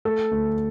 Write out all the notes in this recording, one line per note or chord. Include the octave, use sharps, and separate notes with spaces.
A3 A4
D2